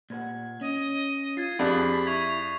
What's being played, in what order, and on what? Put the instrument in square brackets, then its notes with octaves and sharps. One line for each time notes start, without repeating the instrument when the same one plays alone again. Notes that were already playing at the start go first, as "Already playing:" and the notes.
[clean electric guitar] A#2 B4 F#5 [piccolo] G#6
[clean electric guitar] C#4 [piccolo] D#5
[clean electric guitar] F4 [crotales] G#6 A6 C7
[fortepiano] F2 D4 [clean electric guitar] G4 G#4 [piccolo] B5
[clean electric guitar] E4 [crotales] C#6 G#6 B6 [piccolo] F7